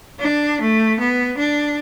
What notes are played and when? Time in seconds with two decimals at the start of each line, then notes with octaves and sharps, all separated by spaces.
0.20 D4
0.61 A3
1.00 B3
1.38 D4